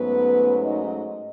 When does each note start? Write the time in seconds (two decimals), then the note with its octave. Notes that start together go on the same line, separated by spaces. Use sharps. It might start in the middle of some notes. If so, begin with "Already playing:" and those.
Already playing: G#2 F#3 A3 B3 C#4 B4
0.64 D#4 D#5